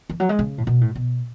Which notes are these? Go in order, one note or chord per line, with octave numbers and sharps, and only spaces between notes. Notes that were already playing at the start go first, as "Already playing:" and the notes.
E3
F#3
G#3
C#3
A2
B2
A2
B2